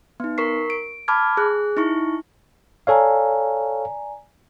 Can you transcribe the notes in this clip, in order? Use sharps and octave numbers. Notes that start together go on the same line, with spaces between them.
B3 D#4
A#4 C#6 B6 C7
D7
A5 B5 D6 F6 G#6
G#4 F#6
D#4 E4 C#6
A4 C#5 D5 F5 G#5 A#5